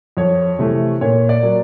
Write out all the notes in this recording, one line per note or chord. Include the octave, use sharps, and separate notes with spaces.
F2 C#5
C3 E3 A3
A#2 C#5
D5
F#3 A#3